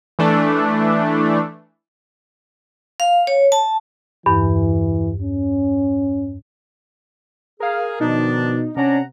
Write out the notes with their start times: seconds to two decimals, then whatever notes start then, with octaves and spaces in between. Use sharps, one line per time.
0.19 E3 A3 D4
3.00 F5
3.27 C#5
3.52 A5
4.26 E2 G2 E3
5.22 C#4
7.60 G#4 A#4 F5
8.01 B2 D#3 F3 D4 D#4
8.76 C3 C#4 D4 F#5 A#5